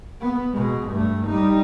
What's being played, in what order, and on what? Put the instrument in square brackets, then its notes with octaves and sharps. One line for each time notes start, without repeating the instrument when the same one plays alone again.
[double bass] B3
B2 G#3
G2 A3
G3 D#4